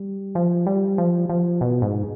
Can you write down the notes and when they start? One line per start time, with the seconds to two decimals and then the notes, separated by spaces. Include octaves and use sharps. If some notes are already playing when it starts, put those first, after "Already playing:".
Already playing: G3
0.35 F3
0.67 G3
0.98 F3
1.29 F3
1.61 B2
1.82 G#2